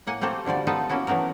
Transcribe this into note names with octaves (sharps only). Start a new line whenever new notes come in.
A2 A#3 F#5 G#5
A3 A#3 C4 G4 A4
B2 D3 F3 G3 D5
B3 D#4 F4 A4 B4
A#3 C#4 E4 F#4
E3 F#3 A3 B3 A#4